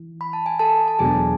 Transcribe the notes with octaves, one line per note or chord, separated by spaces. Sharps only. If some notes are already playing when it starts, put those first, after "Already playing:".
Already playing: E3
B5
A5
G#5
A4 A5
A5
E2 B2 F#3 B3 D4 G#4 G#5